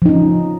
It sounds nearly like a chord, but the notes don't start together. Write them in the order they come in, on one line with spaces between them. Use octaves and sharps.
F3 D#4 C#4